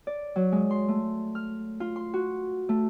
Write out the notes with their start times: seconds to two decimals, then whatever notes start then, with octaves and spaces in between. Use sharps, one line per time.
0.07 D5
0.36 F#3
0.52 G#3
0.71 C6
0.88 A3
1.35 F6
1.80 F4
1.96 C6
2.14 F#4
2.69 A3